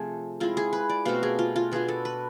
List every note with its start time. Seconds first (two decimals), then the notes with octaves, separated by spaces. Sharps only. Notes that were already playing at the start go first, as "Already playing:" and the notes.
Already playing: C3 F3 A3 C4 G#4
0.40 G#3 C4 E4 F4
0.57 G#4
0.73 B4
0.89 D5
1.05 B2 A3 C4 F5
1.23 G#4
1.39 F4
1.56 F4
1.71 B2 B3 D4 F4 G#4
1.88 A4
2.05 B4